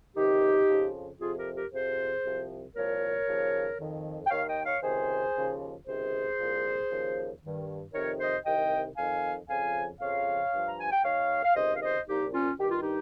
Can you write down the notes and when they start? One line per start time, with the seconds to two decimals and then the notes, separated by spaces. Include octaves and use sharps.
0.17 C#2 C3 D#3 D#4 G4
0.69 F2 C#3 F3
1.20 F2 C3 F3 F4 G#4
1.37 G4 A#4
1.55 G4 A#4
1.72 F2 C3 F3 G#4 C5
2.24 C2 C3 F3
2.76 C2 A#2 F3 A#4 C#5
3.27 D#2 C#3 F3
3.79 F2 D#3
4.26 G5
4.31 D#2 D#3 C#5 F5
4.48 D#5 G5
4.66 C#5 F5
4.83 C#2 C3 D#3 G#4 C5
5.35 D#2 C#3 F3
5.86 C#2 C3 D#3 G#4 C5
6.39 C2 A#2 F3
6.91 D#2 C#3 F3
7.42 G2 D#3
7.94 F2 C3 D#3 A#4 C#5
8.19 C5 D#5
8.46 C2 C3 D#3 D#5 G5
8.97 F2 D#3 F5 G#5
9.49 F2 C#3 F3 F5 G#5
10.01 F2 C#3 F3 C#5 F5
10.53 G2 F3
10.67 A#5
10.80 G#5
10.92 G5
11.04 D#2 D#3 C#5 F5
11.44 F5
11.56 C#2 C3 D#3 C5 D#5
11.75 F5
11.82 C5 D#5
12.07 C2 A#2 F3 D#4 G4
12.33 C#4 F4
12.60 G2 D#3 G4
12.71 F4
12.82 D#4 G4